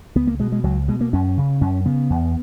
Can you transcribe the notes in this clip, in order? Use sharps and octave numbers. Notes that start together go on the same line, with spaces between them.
C#2 B3
A#3
B2 G#3
G#3
C#2 F#3
B2 G#3
A#3
F#2 C#4
C#3
F#2 C#4
C#3 B3
E2